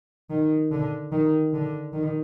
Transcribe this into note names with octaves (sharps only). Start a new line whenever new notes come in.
D#3
D3
D#3
D3
D#3